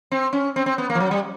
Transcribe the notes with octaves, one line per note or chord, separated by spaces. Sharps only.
C4
C#4
C4
C4
B3
A#3
F3
F#3
G3